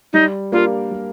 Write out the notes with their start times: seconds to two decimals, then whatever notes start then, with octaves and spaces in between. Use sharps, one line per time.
0.13 G3 D#4
0.52 A#3 D4 F4 G4 A#4
0.91 G3